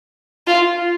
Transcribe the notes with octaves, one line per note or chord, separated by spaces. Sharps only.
F4